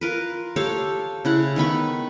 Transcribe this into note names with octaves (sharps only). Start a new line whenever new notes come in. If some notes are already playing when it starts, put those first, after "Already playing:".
F4 A#4 B4
G4 A4 C#5 F5
C#3 E4 F#5
D#3 B3 B5 C#6